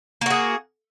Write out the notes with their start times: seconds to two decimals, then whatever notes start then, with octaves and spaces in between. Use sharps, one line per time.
0.21 A#3
0.26 F#4
0.30 G#4